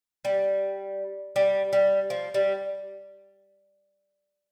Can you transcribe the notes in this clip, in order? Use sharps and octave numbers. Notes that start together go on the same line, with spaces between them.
G3
G3
G3
F3
G3